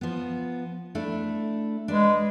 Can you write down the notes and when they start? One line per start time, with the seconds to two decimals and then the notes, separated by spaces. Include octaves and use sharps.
0.01 F3 B3
0.95 A3 D4 E4
1.88 G#3 D4 B4